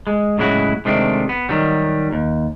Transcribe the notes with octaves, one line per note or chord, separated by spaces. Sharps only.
G#3
A2 C#3 F#3 G#3 E4 F#4
C3 D#3 G#3 A3 C4 D4
B3
D#3 F#3 G3
D#2